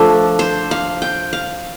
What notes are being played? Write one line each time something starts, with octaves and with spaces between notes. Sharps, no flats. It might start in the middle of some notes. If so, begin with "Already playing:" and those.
Already playing: F3 A3 D4 A4
C5
F5
G5
F5